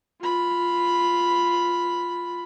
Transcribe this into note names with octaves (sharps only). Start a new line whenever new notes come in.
F4 B5